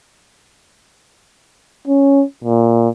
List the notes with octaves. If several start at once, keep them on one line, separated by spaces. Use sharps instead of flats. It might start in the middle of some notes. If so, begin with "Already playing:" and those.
C#4
A#2